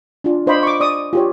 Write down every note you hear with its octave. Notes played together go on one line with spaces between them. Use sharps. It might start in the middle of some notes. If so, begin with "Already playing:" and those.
D4 F4
D4 C5 D#5 F5 B5 D6
C#6 D6
D5 C#6 D#6
F4 G4 C#5